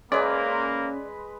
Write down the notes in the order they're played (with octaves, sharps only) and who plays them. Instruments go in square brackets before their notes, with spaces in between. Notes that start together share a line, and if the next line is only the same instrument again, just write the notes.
[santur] G#3 B4 [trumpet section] A#3 [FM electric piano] C#4 [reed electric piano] D5